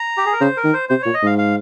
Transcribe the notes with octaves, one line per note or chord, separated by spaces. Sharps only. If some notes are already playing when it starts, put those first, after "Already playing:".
Already playing: A#5
G4
G#4
A#4
C#3 C5
A#4
D#3
C5
C3 C5
A#2 C#5
D#5
G#2 F5
F5